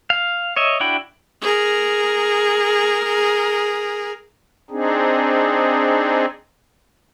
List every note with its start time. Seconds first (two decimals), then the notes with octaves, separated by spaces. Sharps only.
0.10 F5
0.56 C#5 D#5 E5
0.80 D4 E4 F#4 G5 B5
1.42 G#4 A#4
4.70 C4 D4 D#4 G#4